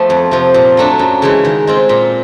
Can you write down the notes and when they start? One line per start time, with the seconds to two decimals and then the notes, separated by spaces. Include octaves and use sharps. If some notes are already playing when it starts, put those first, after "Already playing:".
Already playing: F3 A3 B3
0.10 F2
0.31 C3 F3
0.54 A#2
0.77 F#3 A3 D4
0.99 F#2
1.22 C#3 E3 G#3
1.45 D#3
1.67 G#3 C4 F4
1.89 A#2